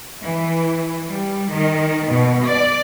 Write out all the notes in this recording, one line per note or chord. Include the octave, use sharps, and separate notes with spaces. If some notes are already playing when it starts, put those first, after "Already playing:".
E3
G3
D#3
B2
D5